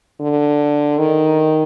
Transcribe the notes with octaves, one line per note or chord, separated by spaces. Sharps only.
D3
D#3